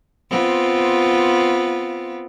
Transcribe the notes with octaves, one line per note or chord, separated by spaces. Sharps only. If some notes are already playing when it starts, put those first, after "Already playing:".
B3 C4 F4